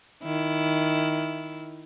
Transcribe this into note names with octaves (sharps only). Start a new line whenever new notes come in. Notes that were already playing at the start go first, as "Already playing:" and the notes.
D#3 E4